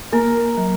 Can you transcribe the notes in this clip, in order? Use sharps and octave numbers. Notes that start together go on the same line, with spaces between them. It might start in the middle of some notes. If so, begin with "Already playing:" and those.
A#3 A#4
F#3